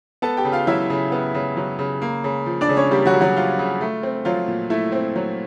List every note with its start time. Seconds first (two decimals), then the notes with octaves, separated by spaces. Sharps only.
0.22 B3 A4 A5
0.37 G4 G5
0.45 C#3
0.52 F4 F5
0.67 F#3 E4 E5
0.90 C#3
1.12 B3
1.35 C#3
1.57 F#3
1.79 C#3
2.02 A#3
2.24 C#3
2.46 F3
2.61 D4 D5
2.69 C#3
2.77 C#4 C#5
2.91 G3 A#3 G4
3.06 F#3 F#4
3.14 C#3
3.21 F#3 F#4
3.36 F3 F4
3.59 C#3
3.81 A3
4.03 C4
4.25 F3 F#3 F4
4.48 A#2
4.70 A3 E4
4.92 C4
5.16 F#3